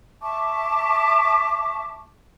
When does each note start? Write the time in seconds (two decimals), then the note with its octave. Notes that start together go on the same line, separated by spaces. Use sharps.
0.21 E5 A5 C#6 D6